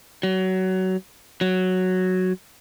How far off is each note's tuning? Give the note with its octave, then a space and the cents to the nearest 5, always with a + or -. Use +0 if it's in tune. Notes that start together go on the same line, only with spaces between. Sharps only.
F#3 +20
F#3 +0